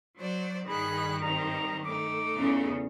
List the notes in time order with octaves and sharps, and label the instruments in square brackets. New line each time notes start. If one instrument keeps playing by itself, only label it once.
[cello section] F#3 [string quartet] C5 D5
[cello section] G2 D#3 [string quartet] G#4 F#6 [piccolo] B5
[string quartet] G3 C4 [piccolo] A#5
[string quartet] A3 D#4 [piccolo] D6
[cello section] E2 C#3